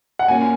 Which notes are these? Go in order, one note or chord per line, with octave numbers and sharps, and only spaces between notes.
F#5
A#2 A#3 C#4 F#4 G#5